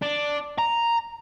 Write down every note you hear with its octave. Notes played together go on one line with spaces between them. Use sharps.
D4
A#5